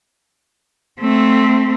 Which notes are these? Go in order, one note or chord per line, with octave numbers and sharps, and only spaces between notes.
A3 C4